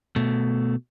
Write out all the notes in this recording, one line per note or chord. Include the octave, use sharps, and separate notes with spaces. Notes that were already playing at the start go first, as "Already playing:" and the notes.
B2 A3